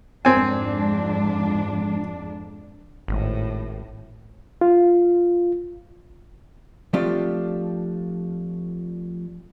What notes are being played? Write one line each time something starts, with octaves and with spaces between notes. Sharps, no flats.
F2 G#2 C4 D4 G#5
G#1 A2
F4
F3 A3 C4 D4 F4 G4